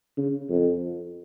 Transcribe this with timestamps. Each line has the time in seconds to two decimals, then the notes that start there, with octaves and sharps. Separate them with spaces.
0.18 C#3
0.49 F2